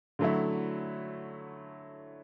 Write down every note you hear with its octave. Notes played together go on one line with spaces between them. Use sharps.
D3 F#3 A3 E4